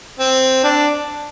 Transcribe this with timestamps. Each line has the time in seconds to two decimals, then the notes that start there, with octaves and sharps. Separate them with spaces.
0.20 C4
0.64 D4